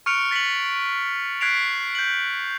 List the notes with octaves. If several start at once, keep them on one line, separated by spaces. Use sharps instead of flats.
C#6 F6 F#6 C#7 D7 F7
A6 B6 C#7 F7 F#7
F#6 G#6 B6 C7 D7 F7
G6 F#7